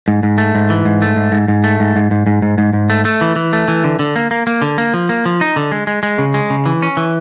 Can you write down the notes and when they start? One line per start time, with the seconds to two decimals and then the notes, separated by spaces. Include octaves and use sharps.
0.08 G#2
0.23 G#2
0.38 A3
0.55 G#2
0.70 E3
0.85 G#2
1.02 A3
1.16 G#2
1.32 G#2
1.48 G#2
1.64 A3
1.80 G#2
1.96 G#2
2.11 G#2
2.27 G#2
2.42 G#2
2.58 G#2
2.73 G#2
2.90 A3
3.05 A3
3.21 E3
3.36 E3
3.53 A3
3.68 E3
3.84 D3
3.99 D3
4.16 A#3
4.31 A#3
4.47 A#3
4.62 D3
4.78 A#3
4.94 F3
5.09 A#3
5.26 F3
5.41 D#4
5.56 D3
5.72 G#3
5.87 G#3
6.03 G#3
6.18 C#3
6.34 G#3
6.50 C#3
6.66 E3
6.82 C#4
6.97 E3